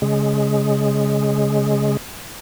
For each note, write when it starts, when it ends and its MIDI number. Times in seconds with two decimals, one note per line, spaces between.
0.02 1.97 49
0.02 1.97 56